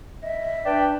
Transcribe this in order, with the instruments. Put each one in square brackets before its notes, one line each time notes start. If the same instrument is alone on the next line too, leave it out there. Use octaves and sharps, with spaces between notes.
[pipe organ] D#5 [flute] E5
[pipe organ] D4 A5 [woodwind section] B4 D5 [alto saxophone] G5